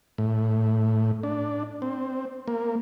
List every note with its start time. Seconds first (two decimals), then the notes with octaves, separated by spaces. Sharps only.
0.18 A2
1.23 D4
1.82 C4
2.48 A#3